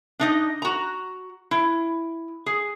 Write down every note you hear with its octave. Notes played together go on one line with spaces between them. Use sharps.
D4 D#4 D#5
F#4 A#5
E4
G#4